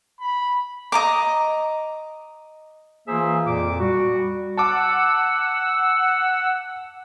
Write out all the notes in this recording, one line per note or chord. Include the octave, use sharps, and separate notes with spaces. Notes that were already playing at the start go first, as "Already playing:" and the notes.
B5
D#5 A#5 D6
E3 A#3 F4 G#4 C5 E5
F2 A#2 D6
G3 F#4
F#5 A5 D6 E6